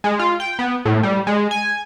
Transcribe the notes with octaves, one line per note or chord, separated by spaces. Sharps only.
G#3
F4
G5
B3
A2
G3
G#3
G#5